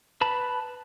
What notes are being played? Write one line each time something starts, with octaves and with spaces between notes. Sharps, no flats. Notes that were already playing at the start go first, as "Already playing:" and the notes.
B4 A5 B5